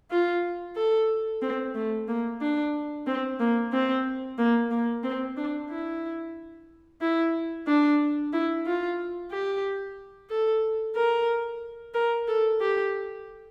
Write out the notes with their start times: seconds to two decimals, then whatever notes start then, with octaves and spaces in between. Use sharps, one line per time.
0.11 F4
0.76 A4
1.42 C4
1.75 A3
2.08 A#3
2.41 D4
3.07 C4
3.40 A#3
3.73 C4
4.38 A#3
4.71 A#3
5.04 C4
5.37 D4
5.70 E4
7.01 E4
7.67 D4
8.33 E4
8.66 F4
9.31 G4
10.30 A4
10.96 A#4
11.94 A#4
12.28 A4
12.61 G4